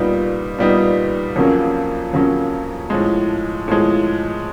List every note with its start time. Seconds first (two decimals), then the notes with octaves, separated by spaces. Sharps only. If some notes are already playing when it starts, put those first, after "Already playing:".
Already playing: A#2 G3 B3 D#4
0.58 A#2 G3 B3 D#4
1.36 F2 C#3 F#3 A#3 C#4
2.13 F2 C#3 F#3 A#3 C#4
2.90 A2 F3 G#3
3.68 A2 F3 G#3